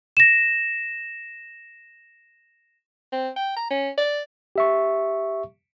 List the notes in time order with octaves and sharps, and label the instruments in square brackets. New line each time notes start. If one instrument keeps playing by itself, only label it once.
[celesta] A#6 E7
[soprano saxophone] C4
G5
A#5
C#4
D5
[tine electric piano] G4 E5 C#6